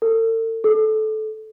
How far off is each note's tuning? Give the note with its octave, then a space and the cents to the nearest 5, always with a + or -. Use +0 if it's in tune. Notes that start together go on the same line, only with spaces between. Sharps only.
A4 +45
A4 -20